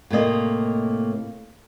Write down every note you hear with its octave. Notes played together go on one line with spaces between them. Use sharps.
A2 C3 A#3 D#5